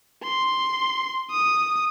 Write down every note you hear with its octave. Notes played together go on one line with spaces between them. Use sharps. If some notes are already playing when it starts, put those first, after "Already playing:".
C6
D#6